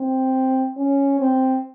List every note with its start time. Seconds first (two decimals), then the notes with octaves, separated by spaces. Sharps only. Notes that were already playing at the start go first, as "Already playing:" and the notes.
Already playing: C4
0.77 C#4
1.20 C4